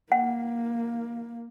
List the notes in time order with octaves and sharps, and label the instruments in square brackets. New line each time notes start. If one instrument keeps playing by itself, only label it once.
[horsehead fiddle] A#3 [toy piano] F#5